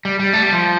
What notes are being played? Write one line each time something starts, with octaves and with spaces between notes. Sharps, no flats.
G3
G3
A3
G3
F3